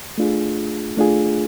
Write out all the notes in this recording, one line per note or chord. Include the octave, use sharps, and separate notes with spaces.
A3 D4 F4 G#4
A3 D4 F4 G#4